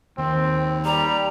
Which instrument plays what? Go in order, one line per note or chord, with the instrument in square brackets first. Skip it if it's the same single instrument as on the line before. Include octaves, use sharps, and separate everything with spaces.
[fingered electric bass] D#2 [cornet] C4
[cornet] G3 [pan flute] A#5